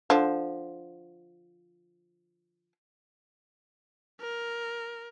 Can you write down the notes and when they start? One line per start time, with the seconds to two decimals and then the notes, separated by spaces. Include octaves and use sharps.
0.10 D3 F3
4.21 A#4